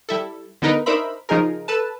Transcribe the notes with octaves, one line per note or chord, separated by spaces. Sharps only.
G3 E4 A4
D3 B3 D#4 A#4 B4
D4 D#4 A#4 C5 E5 B5
C#3 F3 D#4 G#4 A#4
A4 B4 A5